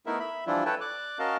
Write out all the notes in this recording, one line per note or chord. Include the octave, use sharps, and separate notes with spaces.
A3 B3 D#4 E4 A#4 E5
E5 B5
E3 F3 G3 D4 E4 F4
A4 B4 C#5 G5 A5
D5 D6 F#6
C#4 F#4 A#4 D#5 F5 A5